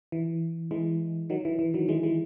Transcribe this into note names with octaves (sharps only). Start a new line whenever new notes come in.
E3
E3 G#3
D#3 F#3
E3
E3
D#3 F#3
E3 G#3
E3 G#3